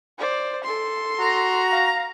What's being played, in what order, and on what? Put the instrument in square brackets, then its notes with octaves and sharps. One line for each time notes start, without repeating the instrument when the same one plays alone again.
[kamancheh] C5 D5
A4 C6
[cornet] F#4 [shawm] A#5
[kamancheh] F5